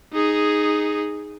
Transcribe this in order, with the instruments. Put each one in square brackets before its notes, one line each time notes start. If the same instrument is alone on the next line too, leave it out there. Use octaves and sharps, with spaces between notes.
[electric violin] D#4 G#4